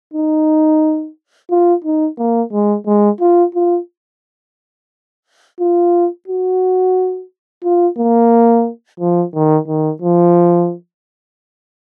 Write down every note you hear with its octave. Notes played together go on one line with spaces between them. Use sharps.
D#4
F4
D#4
A#3
G#3
G#3
F4
F4
F4
F#4
F4
A#3
F3
D#3
D#3
F3